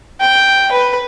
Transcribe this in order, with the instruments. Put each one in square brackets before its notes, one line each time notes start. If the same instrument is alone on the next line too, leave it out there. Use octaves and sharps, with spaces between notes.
[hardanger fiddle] G5
B4